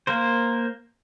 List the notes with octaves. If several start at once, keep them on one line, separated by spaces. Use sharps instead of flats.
A#3 A#4 C5